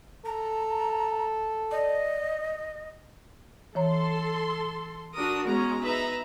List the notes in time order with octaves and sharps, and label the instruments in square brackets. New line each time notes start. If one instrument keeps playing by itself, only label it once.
[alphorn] A4 [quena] A#5
[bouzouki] D5 [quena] D#5
[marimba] E3 C#5 A#5 [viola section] A4 C6
[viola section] D4 F#4 A#4 [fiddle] D#6
[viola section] G#3 C#4 [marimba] B3 F#4 [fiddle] A#5
[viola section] D#4 E5 [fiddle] B4 A#5